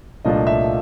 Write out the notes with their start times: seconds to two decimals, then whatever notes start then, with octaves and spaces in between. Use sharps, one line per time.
0.25 C2 A#2 F3 A3 D4 D#5
0.47 E5